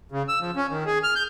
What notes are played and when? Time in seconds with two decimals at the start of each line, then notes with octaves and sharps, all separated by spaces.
0.12 C#3
0.28 E6
0.40 F3
0.56 C#4
0.70 D#3
0.86 G#4
1.04 F6
1.16 G6